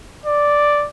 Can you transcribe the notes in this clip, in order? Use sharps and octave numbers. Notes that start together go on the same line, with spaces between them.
D5